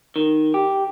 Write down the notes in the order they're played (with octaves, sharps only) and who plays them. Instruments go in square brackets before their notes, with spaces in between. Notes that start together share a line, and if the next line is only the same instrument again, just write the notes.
[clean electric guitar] D#3
G4